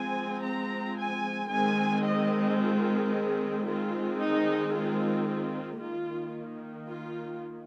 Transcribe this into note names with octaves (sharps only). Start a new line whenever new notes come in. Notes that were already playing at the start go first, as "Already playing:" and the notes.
Already playing: F3 G#3 C4 G#5
A#5
G#5
D#3 G#3 C4 G#5
D#5
F4
G#4
D#3 G#3 C4 F4
D#4
F4
F4
D#3 A#3 F4
F4